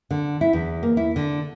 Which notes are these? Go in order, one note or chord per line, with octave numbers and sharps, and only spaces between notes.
D3
E4
E2
A#3
E4
D3